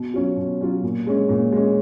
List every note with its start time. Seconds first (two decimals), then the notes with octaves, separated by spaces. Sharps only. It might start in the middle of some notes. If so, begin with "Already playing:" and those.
Already playing: B2
0.14 F#3 C#4 F4
0.36 B2
0.61 F#3 C#4 F4
0.83 A#2
1.07 G#3 C#4
1.29 A#2
1.52 G#3 C#4